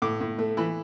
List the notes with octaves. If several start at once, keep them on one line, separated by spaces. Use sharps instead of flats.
A2 D6
A2
A3
E3 B5